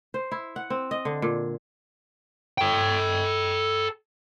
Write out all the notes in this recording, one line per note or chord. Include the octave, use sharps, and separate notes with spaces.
C5
E4
F#5
C4
D#5
D3
A#2
A4 G5